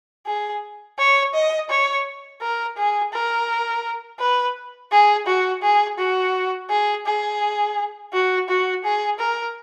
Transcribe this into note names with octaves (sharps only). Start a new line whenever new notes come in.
G#4
C#5
D#5
C#5
A#4
G#4
A#4
B4
G#4
F#4
G#4
F#4
G#4
G#4
F#4
F#4
G#4
A#4